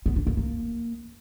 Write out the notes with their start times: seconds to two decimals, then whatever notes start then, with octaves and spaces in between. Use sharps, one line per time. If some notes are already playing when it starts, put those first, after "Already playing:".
0.06 B3
0.16 D4
0.27 A#3
0.37 A#3